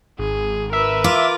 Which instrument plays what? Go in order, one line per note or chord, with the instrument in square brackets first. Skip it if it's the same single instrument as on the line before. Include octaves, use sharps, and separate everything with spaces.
[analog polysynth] G#1 [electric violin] G#4
[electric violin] A#4 B4 [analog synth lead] E5
[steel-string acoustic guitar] F4 [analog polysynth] D6